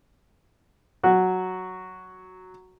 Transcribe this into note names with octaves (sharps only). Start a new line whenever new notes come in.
F#3 F#4